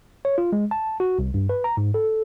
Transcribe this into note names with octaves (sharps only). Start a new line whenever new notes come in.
C#5
F4
G#3
A5
F#4
C2
G2
B4
A#5
G#2
A4